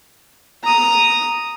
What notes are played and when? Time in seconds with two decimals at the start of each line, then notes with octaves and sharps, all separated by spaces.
0.64 A#5 D#6